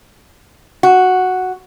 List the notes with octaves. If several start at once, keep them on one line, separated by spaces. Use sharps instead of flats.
F#4